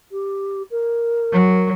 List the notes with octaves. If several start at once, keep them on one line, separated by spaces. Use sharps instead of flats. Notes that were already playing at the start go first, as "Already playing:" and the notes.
G4
A#4
F#3